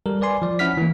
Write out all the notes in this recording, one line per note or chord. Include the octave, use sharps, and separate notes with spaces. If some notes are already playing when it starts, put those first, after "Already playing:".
G3 A4 A#4
B4 D5 G#5 C6
F3 D5
C#4 E4 F#5 F6 B6
E3 A#3